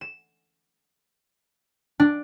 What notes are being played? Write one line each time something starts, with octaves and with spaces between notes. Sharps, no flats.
E7
D4